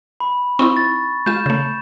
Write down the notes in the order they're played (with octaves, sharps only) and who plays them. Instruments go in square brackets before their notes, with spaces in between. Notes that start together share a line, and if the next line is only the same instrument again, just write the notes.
[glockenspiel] B5
[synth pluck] C4 D#4 E4 [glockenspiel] C#6
[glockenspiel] A6
[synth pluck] G#3 F4 [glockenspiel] G6 E7
[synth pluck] C#3 A3